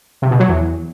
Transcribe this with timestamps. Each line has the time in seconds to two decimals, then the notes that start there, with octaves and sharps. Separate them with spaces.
0.22 C3
0.31 B2
0.40 F#3
0.49 E2